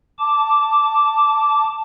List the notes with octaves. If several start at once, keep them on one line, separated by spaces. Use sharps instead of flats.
A5 D6